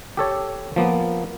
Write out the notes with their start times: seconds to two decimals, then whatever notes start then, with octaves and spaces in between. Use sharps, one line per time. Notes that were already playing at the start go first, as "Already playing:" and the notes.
0.17 G4 A4 C#5
0.76 F3 A#3 B3